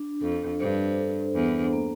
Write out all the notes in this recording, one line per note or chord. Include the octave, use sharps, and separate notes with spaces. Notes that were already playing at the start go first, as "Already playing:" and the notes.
Already playing: D4
F2 A4
G2 C5
A4
E2 D4
A#3